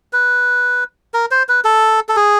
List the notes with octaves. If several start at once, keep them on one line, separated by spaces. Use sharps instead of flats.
B4
A#4
C5
B4
A4
A4
G#4